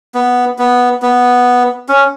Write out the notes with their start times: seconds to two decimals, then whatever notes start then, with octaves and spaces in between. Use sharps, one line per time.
0.14 B3
0.59 B3
1.02 B3
1.89 C#4